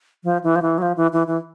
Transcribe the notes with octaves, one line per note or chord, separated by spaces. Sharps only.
F3
E3
F3
E3
F#3
F3
E3
E3
E3